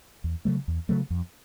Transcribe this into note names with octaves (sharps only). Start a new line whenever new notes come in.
E2
C#3 F#3 A3
E2
C#3 F#3 A3
F2